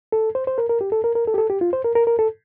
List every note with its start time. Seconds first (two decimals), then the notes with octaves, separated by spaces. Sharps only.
0.12 A4
0.35 C5
0.47 C5
0.58 A#4
0.69 A#4
0.81 G4
0.92 A4
1.04 A#4
1.15 A#4
1.27 A4
1.34 G4
1.38 A4
1.50 G4
1.61 F4
1.73 C5
1.84 A#4
1.95 A#4
2.07 A#4
2.19 A4